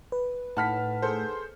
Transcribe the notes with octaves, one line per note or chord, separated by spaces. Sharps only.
B4
A2 D#4 F#5 A5 B5 F6 B6
G#4 A4 C5